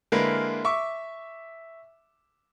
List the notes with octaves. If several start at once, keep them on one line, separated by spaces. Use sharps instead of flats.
D3 G#3 A#3 E4 A#4 B4
E5 C#6 D6